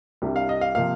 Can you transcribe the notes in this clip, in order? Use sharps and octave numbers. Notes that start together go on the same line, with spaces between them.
C2 C3 G3 D4
F5
D#5
F5
C3 F3 A#3 F5